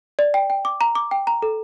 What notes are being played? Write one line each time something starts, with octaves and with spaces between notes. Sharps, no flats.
D5
G5
G5
D6
A#5
D6
G5
A#5
A4